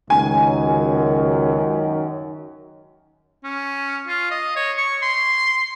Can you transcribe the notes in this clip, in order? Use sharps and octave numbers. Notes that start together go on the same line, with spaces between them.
C#2 F#2 D#3 G#5
C#4
F4
D#5
C#5
C#6
C6